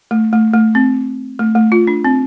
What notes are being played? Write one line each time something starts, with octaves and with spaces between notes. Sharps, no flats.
A3
A3
A3
C4
A3
A3
F4
D4
C4